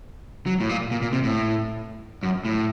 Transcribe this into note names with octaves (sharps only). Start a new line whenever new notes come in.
F#3
A2
A#2
A#2
A#2
C3
A2
F#2
A2